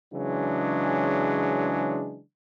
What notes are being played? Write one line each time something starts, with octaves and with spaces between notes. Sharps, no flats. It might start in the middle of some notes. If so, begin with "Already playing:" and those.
C#3 E3 F#3 G#3 D4